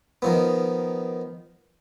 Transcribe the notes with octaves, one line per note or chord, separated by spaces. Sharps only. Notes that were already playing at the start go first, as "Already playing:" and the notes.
D#3 F3 B3